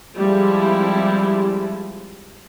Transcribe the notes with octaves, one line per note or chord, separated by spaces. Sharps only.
F3 G3 G#3 C4 E4